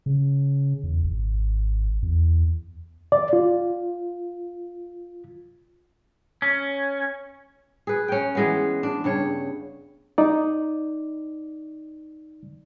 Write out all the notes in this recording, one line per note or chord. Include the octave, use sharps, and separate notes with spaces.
C#3
E2
G#1
E2
D5
F4
C#4
G#4 B4
C#4 G5
E3 G#3 B3
D4
G2 C#3 C#5
D#4 D5